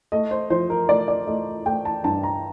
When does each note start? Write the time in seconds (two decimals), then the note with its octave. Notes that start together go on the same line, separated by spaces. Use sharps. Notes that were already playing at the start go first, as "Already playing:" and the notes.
0.12 A3 D#5
0.31 C5
0.50 F3 C5
0.70 A#4
0.89 A3 D5
1.08 D5
1.27 A3 D#5
1.66 A3 G5
1.85 A5
2.04 G2 A5
2.23 A#5